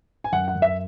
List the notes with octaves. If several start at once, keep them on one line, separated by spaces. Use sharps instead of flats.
G#5
F#2 F#5
F#5
F#2
E5